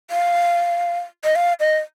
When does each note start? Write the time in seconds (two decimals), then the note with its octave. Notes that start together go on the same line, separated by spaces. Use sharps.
0.10 F5
1.24 D#5
1.35 F5
1.60 D#5